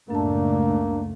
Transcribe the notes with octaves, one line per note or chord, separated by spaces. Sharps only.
C#2 F#2 A2 A3 A#3 D4 A5